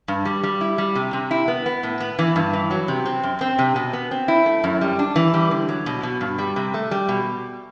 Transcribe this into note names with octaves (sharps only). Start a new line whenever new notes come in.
G2
G3
G3
E4
G3
C3
C3
E4
B3
B3
A2
B3
E3
G2
E3
F#3
C3
C4
F#2
C4
C3
B2
B3
C4
E4
A3
F#2
G3
D4
E3
G3
D3
F#3
B2
B2
G2
G3
C3
A3
G3
B2